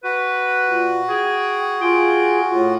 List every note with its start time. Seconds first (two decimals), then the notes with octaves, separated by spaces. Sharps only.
0.04 F#4 B4
0.67 A#2
1.09 G#4 G5
1.81 F4 G#4 G5
2.50 A2 F4